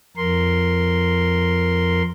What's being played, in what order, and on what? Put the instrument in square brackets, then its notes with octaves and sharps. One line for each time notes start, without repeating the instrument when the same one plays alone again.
[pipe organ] F2 A#4 C6